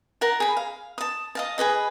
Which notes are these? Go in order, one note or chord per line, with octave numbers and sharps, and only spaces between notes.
A#4 F#5 A5
G#4 B5
F5
A5 D#6
D#5 F5 A5
G#4 A4 B4 D#5